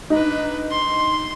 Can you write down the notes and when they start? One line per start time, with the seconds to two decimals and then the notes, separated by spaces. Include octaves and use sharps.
0.10 D4 D#4 B4
0.71 C6